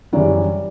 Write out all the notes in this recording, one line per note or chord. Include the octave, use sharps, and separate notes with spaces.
F#2 C#3 E3 G3 D5